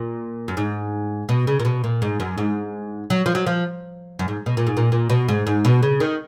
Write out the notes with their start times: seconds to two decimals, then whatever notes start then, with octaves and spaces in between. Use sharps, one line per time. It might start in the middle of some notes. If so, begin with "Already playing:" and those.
Already playing: A#2
0.48 F#2
0.57 G#2
1.29 B2
1.47 C#3
1.60 A#2
1.65 B2
1.84 A#2
2.02 G#2
2.20 F#2
2.38 G#2
3.10 F#3
3.26 F3
3.35 F#3
3.47 F3
4.19 F#2
4.28 G#2
4.46 B2
4.57 A#2
4.67 G#2
4.77 A#2
4.92 A#2
5.09 B2
5.29 G#2
5.47 G#2
5.65 B2
5.83 C#3
6.00 D#3